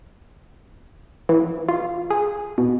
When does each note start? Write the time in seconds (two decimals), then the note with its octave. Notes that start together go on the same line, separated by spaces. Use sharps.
1.29 E3
1.69 F4
2.10 G#4
2.58 B2